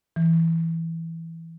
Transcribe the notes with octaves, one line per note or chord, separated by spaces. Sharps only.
E3